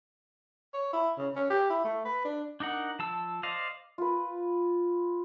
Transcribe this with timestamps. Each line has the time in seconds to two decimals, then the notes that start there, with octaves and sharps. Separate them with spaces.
0.74 C#5
0.93 E4
1.18 C#3
1.35 C#4
1.50 G4
1.70 E4
1.84 A3
2.05 B4
2.25 D4
2.60 D4 D#4 A#4 F#5
2.99 F3 A5 E6
3.43 C5 D5 D#5 F5
3.98 F4 B4